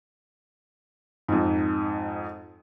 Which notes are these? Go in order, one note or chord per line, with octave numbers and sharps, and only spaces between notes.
F2 G#2